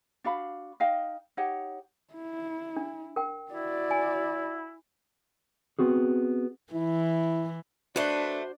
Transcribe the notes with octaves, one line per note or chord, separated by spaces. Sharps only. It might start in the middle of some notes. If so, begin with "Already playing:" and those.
D4 F#4 F5 B5
D#4 D#5 F5 G5
D#4 G4 C#5 F#5
E4
D4
A#4 G5
E4 F#4 D5
G#5
B3 C4 F#4 G#4
E3 E4
A3 D4 F#4 B4 C5